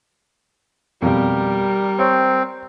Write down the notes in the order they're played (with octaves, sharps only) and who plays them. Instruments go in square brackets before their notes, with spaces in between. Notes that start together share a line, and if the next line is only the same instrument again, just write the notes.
[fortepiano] F2 B2 [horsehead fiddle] G3 A#4
[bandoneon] C4 [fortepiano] C#5